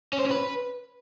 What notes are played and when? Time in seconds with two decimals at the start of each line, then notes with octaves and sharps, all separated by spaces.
0.13 C#4
0.19 C5
0.25 C#4
0.31 B4